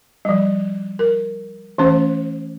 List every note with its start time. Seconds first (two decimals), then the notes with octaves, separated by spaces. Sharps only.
0.25 F3 G3
0.99 A#4
1.78 E3 A3 C#4 C5